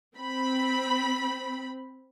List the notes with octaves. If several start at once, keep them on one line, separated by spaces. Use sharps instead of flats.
C4 B5